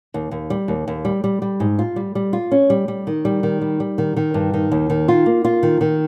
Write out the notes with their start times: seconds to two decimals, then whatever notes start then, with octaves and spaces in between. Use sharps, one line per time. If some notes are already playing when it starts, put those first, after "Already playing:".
0.14 D#2
0.31 D#2
0.50 G3
0.68 D#2
0.88 D#2
1.05 G3
1.24 G3
1.42 G3
1.60 G#2
1.79 F4
1.96 G3
2.15 G3
2.33 F4
2.51 C#4
2.70 G3
2.88 G3
3.07 D#3
3.25 G3
3.43 D#3
3.61 G3
3.80 G3
3.98 D#3
4.17 D#3
4.34 G2
4.54 D#3
4.72 D#2
4.90 D#3
5.08 F4
5.26 A#3
5.44 F4
5.63 D#3
5.81 D#3